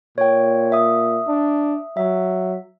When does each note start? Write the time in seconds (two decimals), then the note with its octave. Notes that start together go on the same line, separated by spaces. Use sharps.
0.18 A#2 C#5 G5
0.72 E5 D#6
1.27 D4
1.97 F#3 E5